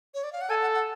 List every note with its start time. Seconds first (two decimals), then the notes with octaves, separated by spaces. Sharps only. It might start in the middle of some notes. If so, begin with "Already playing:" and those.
0.14 C#5
0.24 D5
0.33 F5
0.41 F#5
0.50 A4 G#5
0.62 F#5
0.74 F#5